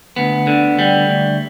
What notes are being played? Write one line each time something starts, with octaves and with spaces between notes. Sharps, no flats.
D2 B3
D3
G3
D2